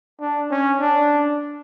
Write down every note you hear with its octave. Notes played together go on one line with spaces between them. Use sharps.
D4
C#4
D4